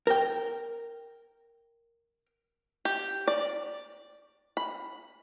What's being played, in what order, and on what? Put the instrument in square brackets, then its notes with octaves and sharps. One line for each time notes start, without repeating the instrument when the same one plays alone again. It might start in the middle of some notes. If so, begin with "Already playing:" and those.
[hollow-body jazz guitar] A#4 G5
[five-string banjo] G4
D5
B5